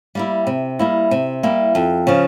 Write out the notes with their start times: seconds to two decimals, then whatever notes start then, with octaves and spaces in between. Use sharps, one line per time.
0.15 G3 A#3 E4
0.47 C3
0.79 G3 A#3 E4
1.11 C3
1.43 G3 A#3 E4
1.75 F2
2.07 C#3 F3